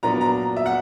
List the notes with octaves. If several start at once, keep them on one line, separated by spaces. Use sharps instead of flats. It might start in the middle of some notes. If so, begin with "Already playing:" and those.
A#2 F#3 B3 D4 A#5
A#5
E5
F#5